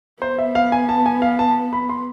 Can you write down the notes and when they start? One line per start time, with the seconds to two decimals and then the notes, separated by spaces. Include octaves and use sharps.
0.22 B3 C5
0.38 E5
0.55 F5
0.72 G#5
0.89 A5
1.06 G#5
1.22 F5
1.39 A5
1.73 B5
1.89 C6